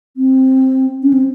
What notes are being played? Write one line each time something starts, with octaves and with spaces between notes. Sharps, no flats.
C4
C#4
C4